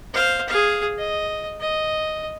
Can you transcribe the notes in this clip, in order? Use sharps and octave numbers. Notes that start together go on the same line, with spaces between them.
C5 F5
G#4 F5
D#5
D#5